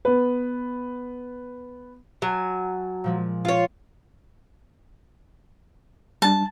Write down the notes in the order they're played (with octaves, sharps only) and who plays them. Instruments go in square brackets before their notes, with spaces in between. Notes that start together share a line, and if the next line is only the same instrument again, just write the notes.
[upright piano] B3 B4
[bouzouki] F#3 [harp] G#5 A5
[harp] A#2 F3 G#3
[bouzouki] F4 C#5
[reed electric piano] G3 D4 [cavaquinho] A5